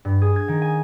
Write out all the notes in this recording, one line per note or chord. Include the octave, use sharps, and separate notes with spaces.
G2
G#4
G#6
D#3
G#5